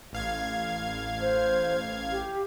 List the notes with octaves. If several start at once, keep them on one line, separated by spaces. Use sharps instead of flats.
A1 F5 G#6
C5
G4